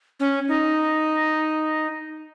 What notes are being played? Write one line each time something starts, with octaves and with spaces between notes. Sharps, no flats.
C#4
D#4